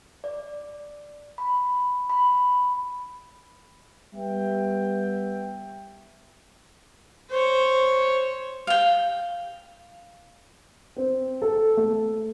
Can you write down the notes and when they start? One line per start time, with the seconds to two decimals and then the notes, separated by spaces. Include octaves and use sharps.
0.24 D5
1.38 B5
2.10 B5
4.14 G3 B3 E5 G5
7.31 C5 C#5
8.67 F5 G5
10.97 C4
11.42 A4
11.77 A3